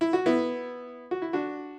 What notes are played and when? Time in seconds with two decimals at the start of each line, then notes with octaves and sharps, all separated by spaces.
0.01 E4
0.13 F#4
0.26 B3 E4
1.11 F#4
1.22 E4
1.33 D4 F#4